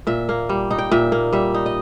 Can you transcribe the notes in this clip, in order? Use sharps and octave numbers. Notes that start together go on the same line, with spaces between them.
A#2 E5
A#3
G3
D#4
G5
A#2 E5
A#3
G3 E5
D#4
D#5